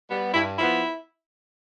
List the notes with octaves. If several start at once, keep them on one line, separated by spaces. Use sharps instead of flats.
G3 B3
G2 E4
F3 B3 E4